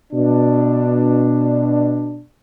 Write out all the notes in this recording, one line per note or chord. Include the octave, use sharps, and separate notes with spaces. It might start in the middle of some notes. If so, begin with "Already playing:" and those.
B2 D4